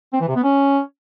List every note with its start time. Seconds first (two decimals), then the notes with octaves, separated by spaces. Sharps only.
0.13 C4
0.21 E3
0.28 C3
0.36 B3
0.43 C#4